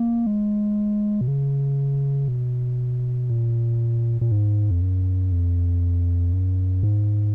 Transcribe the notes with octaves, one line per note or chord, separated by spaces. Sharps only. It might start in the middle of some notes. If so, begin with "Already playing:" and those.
Already playing: A#3
G#3
B2
C#3
B2
A#2
A#2
G#2
F2
F#2
F2
F#2
G#2